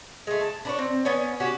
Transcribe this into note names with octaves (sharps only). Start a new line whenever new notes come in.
G#3 A3
A5
D4 B4 C#5
C4
B3 C#4 C#5
C#4 F#4 G4